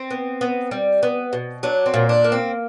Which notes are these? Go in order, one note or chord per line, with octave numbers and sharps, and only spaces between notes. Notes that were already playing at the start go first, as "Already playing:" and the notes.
Already playing: C4
B3
B3
G3
B3
B2
F#3 D4
C4
A#2
D4
A#3
C4